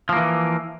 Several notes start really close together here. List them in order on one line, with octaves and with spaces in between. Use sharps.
F3 A#3 E3